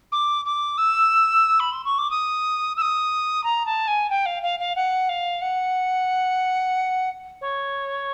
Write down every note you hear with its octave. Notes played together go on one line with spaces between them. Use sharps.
D6
D6
E6
B5
C6
C#6
D6
D#6
E6
D#6
A#5
A5
G#5
G5
F5
F5
F5
F#5
F5
F#5
C#5